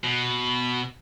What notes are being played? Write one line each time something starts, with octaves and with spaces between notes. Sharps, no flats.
B2